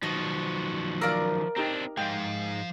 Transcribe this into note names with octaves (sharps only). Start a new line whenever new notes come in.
D#3 F3 F#3 F#4 D#5
A#4 D5 F5 E6
C4 D4 D#4 G4 A#5
G#2 F3 G#3 F5 G5